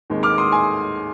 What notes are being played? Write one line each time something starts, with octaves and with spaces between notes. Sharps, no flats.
D#2 D#3 G#3 C4
D6 F6
C6 D#6
G#5 C6